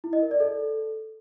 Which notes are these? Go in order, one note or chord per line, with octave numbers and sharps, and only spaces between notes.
E4
D#5
A#4
D5
A4